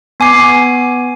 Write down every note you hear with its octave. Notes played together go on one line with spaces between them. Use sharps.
B3 G#5 D6 C7